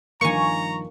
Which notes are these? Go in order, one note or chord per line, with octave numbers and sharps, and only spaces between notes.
G2 D#3 F3 A#3 G#5 A#5 C#6